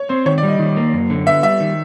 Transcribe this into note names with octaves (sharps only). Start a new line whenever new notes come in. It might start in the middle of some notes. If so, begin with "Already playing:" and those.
Already playing: C#5
C4 C5
D#3 C#5
D5
G3
D#5
D#3
A#3
F#2
D3
B3 E5
G3 E5
D#3